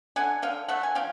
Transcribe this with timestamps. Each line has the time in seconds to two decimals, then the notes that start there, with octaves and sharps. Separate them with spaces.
0.16 D3 F#5 G#5
0.42 D3 F5 G5
0.68 A3 E5 F#5
0.83 G#5
0.95 F3 F5 G5